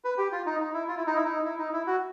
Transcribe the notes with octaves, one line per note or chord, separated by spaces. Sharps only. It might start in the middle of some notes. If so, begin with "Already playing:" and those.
B4
G4
F4
D#4
D#4
E4
F4
E4
D#4
E4
D#4
E4
D#4
E4
F#4